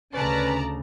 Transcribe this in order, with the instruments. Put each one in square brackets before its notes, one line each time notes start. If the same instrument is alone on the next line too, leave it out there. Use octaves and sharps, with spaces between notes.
[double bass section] D2 C#3 [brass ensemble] C#4 B4 [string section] D5 A5 A#5